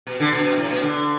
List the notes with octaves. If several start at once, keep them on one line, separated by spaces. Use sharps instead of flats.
B2
D3
B2
B2
A2
B2
D3